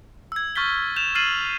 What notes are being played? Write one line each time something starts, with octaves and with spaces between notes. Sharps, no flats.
E6 G#6
C#6 F6 G6 A6 B6 G7
G6 E7 F7
F6 A6 C7 D#7 F#7